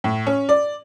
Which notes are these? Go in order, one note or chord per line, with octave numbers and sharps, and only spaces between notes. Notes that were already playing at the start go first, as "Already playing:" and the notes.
A2
C#4
D5